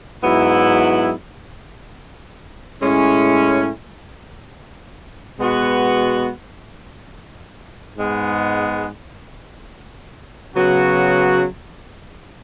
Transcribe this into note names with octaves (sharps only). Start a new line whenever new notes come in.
G#2 F#3 B3 E4
A2 G#3 C#4 E4
B2 G#3 B3 F#4
G#2 G#3 B3
C#3 F#3 B3 F#4